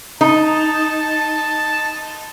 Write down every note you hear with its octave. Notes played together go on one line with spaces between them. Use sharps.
D#4 A5